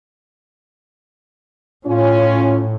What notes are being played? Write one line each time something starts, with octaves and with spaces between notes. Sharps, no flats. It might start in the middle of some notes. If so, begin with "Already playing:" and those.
A2 C#4 F4